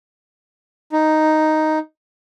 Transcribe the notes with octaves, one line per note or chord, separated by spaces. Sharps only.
D#4